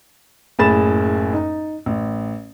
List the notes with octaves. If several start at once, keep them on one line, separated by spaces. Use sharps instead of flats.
F#1 A2 G#4 B5 A6 E7
D#4
A1